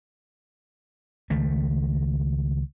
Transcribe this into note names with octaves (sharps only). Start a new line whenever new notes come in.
C#2 D#3 A3